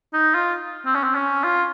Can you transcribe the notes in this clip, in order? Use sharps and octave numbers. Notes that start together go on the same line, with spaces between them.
D#4
F4
C4
C#4
C4
C#4
F4